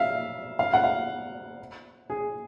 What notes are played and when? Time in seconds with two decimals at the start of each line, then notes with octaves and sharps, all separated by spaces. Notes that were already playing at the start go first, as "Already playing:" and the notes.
Already playing: E5 F5
0.59 F5
0.73 F#5
0.84 F5
2.10 G#4